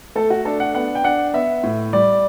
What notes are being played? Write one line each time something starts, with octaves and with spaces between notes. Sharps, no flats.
A3 A4
F#4
D4 A4
F#5
B3 F#5
G5
D4 F#5
B3 E5
A2
G3 D5